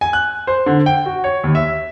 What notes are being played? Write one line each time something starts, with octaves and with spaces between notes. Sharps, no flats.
G#5
F#6
C5
D3
G5
F#4
C#5
D#2
E5